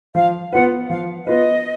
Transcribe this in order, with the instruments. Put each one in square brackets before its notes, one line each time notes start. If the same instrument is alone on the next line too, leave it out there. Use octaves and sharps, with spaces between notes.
[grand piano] F3 [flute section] F5
[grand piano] B3 F4 B4 [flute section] F#5
[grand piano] F3 [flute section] F5
[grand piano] B3 F4 B4 [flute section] D#5